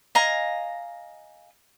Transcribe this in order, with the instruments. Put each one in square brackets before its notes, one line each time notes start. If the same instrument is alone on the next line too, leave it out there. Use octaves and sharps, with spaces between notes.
[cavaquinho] D#5 F5 G#5 A#5